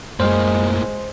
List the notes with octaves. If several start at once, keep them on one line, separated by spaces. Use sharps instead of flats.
F#2 A2 G#3 A#3 C5